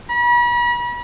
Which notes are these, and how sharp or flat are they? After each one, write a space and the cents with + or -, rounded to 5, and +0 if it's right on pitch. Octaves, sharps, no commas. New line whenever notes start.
B5 -40